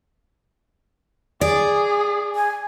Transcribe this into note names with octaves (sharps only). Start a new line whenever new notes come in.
G#4 D5
G#5